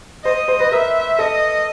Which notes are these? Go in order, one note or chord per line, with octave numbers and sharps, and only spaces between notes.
C5 D#5
C5
B4
A#4 E5
A4 D#5